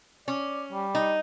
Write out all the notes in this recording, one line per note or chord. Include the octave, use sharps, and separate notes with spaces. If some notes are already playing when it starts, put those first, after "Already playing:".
C#4 D5
G3
D#4